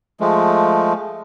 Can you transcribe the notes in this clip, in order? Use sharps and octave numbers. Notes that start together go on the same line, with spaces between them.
F3 G#3 A3